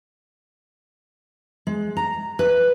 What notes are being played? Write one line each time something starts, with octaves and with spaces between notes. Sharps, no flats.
G#3
A#5
B4